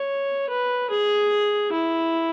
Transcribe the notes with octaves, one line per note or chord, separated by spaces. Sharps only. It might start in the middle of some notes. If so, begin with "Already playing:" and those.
Already playing: C#5
B4
G#4
E4